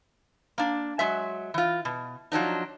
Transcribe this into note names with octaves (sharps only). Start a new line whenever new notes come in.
A#3 D4
F#3 G#3 E5
E3 F4
B2
F3 F#3 D4 D#4